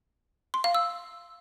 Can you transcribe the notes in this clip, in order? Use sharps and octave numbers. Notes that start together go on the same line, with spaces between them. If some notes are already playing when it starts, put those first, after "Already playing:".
C6
F5
E6